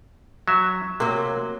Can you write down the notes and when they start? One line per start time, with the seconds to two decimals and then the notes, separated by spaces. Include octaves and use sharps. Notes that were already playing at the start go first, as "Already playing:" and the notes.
0.48 F#3 E5
1.00 C3 F#3 A#3